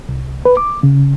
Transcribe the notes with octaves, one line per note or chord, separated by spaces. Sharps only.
C2
B4
D6
C#3